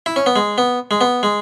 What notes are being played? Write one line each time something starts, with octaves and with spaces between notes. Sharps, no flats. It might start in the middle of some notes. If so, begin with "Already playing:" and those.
E4
C#4
B3
G#3
B3
G#3
B3
G#3